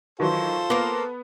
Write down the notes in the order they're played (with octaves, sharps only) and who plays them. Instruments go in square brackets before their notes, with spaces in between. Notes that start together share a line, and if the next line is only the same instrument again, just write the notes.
[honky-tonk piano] D#3 E3 F#3 [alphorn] F4 [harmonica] A4 C5
[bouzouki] A#3 A#4 [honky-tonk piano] B3